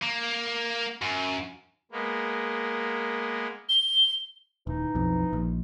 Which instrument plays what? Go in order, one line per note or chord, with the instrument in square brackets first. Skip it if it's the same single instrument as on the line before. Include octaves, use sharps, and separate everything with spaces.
[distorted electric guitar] A#3
F#2
[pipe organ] G#3 A#3 B3
[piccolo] G7
[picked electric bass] D#1 [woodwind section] E3 D#4
[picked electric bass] B1 F2
A#1